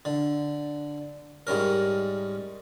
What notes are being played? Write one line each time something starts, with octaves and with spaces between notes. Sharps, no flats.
D3
G#2 G3 C#4 A#4